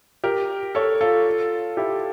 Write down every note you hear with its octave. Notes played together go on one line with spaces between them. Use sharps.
G4 A#4
A4 C#5
F4 A4
E4 G4